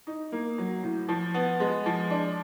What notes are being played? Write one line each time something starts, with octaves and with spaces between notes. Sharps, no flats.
D#4
A#3
F#3
A2
F3
B3
G#3
F3
D4